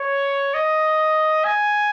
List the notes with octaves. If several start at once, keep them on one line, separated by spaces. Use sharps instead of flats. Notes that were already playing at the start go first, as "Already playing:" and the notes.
Already playing: C#5
D#5
G#5